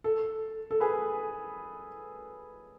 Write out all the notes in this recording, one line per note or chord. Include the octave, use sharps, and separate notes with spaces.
A4
A4
G#4 B4